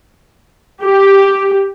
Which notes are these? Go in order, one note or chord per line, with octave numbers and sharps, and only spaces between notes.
G4